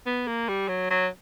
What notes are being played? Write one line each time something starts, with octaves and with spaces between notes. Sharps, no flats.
B3
A#3
G3
F#3
F#3